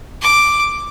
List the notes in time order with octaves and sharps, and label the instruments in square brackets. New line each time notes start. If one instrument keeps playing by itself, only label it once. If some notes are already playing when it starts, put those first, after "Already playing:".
[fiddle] D6